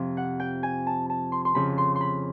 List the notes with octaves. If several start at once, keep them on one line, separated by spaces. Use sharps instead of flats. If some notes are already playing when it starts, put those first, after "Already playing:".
Already playing: F2 C3 F3
F#5
G5
G#5
A5
A5
C6
C6
F2 C#3 F3 B5
C6
C6
B5